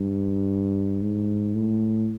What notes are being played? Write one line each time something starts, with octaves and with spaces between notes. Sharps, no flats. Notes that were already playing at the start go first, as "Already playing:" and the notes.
Already playing: G2
G#2
A2